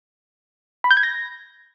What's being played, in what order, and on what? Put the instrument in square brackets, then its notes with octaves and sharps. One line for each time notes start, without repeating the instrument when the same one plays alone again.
[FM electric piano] B5
G6
G#6
A#6